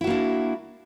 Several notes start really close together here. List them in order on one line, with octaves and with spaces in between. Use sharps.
E4 F#4 A#3 D4